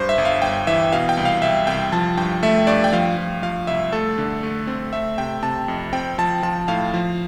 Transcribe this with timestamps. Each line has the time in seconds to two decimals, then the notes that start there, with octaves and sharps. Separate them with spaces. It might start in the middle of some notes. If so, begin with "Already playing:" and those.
Already playing: G2 C5
0.09 E5
0.18 G1
0.25 F5
0.42 G1 G5
0.67 E3 E5
0.92 B2 F5
1.09 G5
1.17 C2
1.25 F5
1.42 C2 E5
1.67 C2 G5
1.92 F3 A5
2.17 G2 G5
2.43 A3 E5
2.67 G2 D5
2.84 G5
2.93 F3 F5
3.17 F3
3.42 F3 F5
3.67 C2 E5
3.92 A3 A4
4.18 D3
4.43 A3
4.67 C4
4.93 A3 E5
5.18 C3 G5
5.42 C3 A5
5.68 F2
5.93 C4 G5
6.18 F3 A5
6.43 F3 A5
6.68 A2 F5
6.94 F3